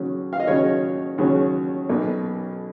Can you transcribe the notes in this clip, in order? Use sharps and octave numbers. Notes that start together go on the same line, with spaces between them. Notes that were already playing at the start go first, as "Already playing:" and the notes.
Already playing: D#2 C#3 F#3 C#4
F5
D#5
D#2 C#3 F#3 C#4 C#5
D#2 C#3 F#3 C#4
B1 B2 A#3